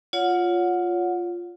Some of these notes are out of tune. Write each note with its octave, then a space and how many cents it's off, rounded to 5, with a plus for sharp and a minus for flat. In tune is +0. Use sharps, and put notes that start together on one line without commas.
F4 +0 C#5 +30 F#5 -20